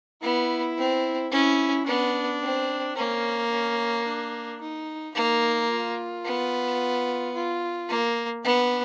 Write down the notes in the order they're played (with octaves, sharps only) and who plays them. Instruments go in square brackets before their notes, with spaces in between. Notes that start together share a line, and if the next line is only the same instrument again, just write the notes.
[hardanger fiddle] B3 [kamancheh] E4
[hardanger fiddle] C4
[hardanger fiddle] C#4 [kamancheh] E4
[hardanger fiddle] B3 [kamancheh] D4
[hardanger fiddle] C4
[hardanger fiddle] A#3 [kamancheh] C#4
[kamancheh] C#4
D4
D#4
[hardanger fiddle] A#3 [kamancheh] D#4
[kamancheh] F4
[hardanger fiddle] B3
[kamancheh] F4
[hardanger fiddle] A#3
[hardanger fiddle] B3 [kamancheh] D4